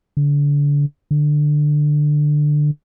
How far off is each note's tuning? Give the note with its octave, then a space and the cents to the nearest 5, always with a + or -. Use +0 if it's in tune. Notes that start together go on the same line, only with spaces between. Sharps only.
D3 -30
D3 +15